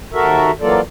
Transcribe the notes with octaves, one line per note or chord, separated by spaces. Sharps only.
D#2 F#4 A4 A#4 E5
E3 F#3 A#3 F4 A4 D5